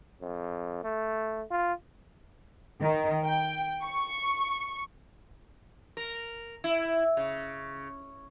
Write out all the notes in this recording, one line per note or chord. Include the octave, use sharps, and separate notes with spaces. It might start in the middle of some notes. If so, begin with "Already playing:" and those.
F2
A3
F4
D#3
G5
C#6
A#4
E4
C#3